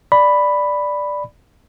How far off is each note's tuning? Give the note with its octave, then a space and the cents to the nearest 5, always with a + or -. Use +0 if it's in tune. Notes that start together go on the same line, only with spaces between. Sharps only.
D5 +0 B5 +0